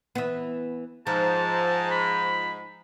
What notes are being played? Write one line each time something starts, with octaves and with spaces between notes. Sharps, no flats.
E3 B3
G#2 F3 A5
B5